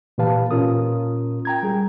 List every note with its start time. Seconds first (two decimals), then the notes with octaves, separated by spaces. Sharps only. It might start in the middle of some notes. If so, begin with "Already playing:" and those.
0.18 A#2 E3 G4 B4 F5 A5
0.51 A#2 C#4 F4 A#4 D#6
1.45 G5 A#5 G#6
1.63 G3 G#4